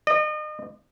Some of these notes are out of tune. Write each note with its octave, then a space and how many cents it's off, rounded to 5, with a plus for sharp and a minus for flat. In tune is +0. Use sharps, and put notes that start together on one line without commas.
D#5 -35